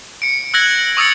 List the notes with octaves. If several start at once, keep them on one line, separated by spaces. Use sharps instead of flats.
C#7 D7
E6 F#6 G#6 A#6 F#7
C#6 D#6 E6 A6 C#7